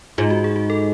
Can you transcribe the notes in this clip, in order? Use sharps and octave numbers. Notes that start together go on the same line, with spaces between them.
G#2 F4
F#4
G#4
F#4
A4